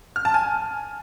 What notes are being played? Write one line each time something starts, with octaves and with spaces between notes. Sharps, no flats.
F6
A5
G#5